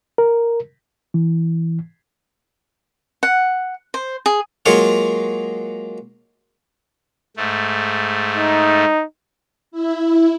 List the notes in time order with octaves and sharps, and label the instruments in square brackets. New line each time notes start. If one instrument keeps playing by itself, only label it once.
[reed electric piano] A#4
E3
[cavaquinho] F#5
C5
G#4
[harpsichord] F#3 G#3 A#3 F4 G#4 C#5
[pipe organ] G#2 A3
[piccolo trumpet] D#4
[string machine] E4